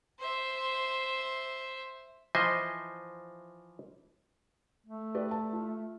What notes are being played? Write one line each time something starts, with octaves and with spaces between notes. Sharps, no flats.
C5 E5
E3 F3 C5 D#5 E5 G#5
A3
G4 B4 D5
A5
F4